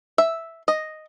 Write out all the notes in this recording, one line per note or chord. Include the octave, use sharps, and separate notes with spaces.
E5
D#5